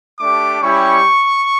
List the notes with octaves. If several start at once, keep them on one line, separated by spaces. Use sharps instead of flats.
A3 D4 G4 D6
G3 C#4 E4 G4 C#6